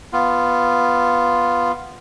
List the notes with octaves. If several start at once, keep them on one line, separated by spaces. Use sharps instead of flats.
B3 F4